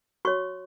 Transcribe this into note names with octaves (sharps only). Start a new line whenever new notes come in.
F#4 C#5 C#6